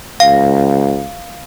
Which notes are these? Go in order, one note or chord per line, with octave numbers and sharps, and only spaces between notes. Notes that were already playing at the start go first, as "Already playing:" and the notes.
C#2 F5